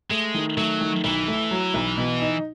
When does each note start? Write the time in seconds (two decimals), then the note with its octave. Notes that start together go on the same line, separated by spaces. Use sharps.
0.10 G#3 A3
0.34 D#3
0.57 F#3 A3
0.81 D#3
1.04 B1 E3
1.28 A3
1.51 F#3
1.74 B1
1.97 B2
2.21 D#4